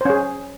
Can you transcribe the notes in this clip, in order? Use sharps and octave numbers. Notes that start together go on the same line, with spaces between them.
C#4 G#4 C5